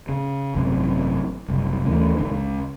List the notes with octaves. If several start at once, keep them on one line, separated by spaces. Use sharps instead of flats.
C#3
G#1 F#2 C3
F#1 C2
D#2 E3 A3 C#4
G#1 D3 D#3 D4
C#2 C#3